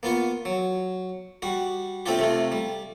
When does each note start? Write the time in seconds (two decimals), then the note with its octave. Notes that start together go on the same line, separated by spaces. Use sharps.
0.03 A#3 B3 F4 C#6
0.45 F#3
1.42 G3 F#4
2.06 A3 C4 D4 F4 G4
2.19 C3 A3 F4
2.52 G3